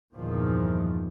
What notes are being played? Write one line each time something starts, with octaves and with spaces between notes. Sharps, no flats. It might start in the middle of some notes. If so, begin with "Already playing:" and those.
G1 E2 A#2 D#3 F3